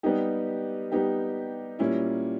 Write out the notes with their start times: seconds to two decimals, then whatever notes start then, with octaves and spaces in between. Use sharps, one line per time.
0.03 G3 B3 D#4 G4
0.92 G3 B3 D#4 G4
1.79 A#2 G3 A#3 C#4 E4